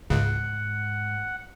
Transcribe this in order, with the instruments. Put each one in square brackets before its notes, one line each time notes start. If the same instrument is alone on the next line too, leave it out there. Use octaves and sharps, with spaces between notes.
[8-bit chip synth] C#2 C#3 [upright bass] G#2 [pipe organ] F#5